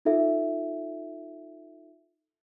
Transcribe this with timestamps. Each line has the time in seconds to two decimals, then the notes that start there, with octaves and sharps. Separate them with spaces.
0.05 D#4 F4 A4 E5